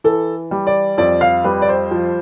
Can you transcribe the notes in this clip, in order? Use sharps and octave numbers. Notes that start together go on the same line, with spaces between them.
E3 A4
G3
D5
F2 D5
F5
G3 B4
D5
C5
F3